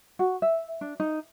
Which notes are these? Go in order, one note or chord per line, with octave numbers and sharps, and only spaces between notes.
F#4
E5
D4
D#4